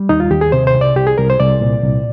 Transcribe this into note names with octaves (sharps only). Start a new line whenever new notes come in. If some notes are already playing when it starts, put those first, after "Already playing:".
Already playing: G3
D#2 D#4
F4
D#2 G4
G#4
C3 C5
C5
C2
D5
C2 G4
G#4
C2 A#4
C5
C2 D5
A#2
C2